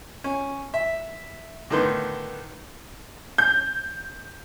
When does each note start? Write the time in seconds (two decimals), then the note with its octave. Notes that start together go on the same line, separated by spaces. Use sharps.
0.24 C#4
0.74 E5
1.70 A2 D3 D#3 B3 C6
3.38 G6